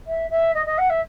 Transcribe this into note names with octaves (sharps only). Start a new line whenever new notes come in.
E5
E5
D#5
D#5
F#5
E5